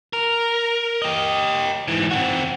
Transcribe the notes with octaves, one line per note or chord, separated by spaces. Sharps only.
A#4
G4 D#5
G#2 E3
C4 F#4